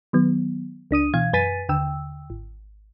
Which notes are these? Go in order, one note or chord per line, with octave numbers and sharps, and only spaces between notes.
D#3 F#3 B3
C#2 D4 D#6 D#7
B2 E3 F5 G#6
F#2 B4 G#5 A6 B6 D#7
D#2 D3 G5 E6
G#1